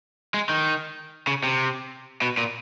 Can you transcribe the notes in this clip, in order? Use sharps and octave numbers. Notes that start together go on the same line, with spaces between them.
G#3
D#3
C#3
C3
B2
A#2